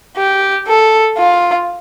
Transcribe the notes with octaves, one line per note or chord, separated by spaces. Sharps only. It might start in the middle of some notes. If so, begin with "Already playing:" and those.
G4
A4
F4